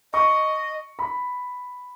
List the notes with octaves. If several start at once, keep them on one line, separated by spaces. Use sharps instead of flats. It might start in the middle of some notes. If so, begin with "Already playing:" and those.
D#5 C#6
B5